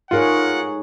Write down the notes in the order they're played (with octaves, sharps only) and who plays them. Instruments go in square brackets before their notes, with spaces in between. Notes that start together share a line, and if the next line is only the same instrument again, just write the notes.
[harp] G#2 A3 [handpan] D#4 G#4 C#5 [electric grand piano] F4 A#4 [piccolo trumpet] F#5